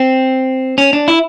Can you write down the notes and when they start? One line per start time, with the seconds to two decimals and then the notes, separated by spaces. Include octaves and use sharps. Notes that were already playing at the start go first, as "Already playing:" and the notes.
Already playing: C4
0.78 C#4
0.93 D4
1.08 E4